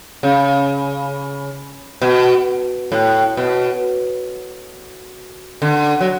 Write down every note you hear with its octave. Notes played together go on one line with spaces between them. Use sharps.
C#3
B2
A2
B2
D3
F#3